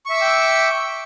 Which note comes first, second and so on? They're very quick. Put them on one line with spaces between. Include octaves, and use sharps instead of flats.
C#6 E5 E6 D6 G5